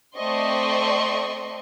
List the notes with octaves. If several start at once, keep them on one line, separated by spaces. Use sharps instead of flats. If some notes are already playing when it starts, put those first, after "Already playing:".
A3 C4 D5 D#5 C6 C#6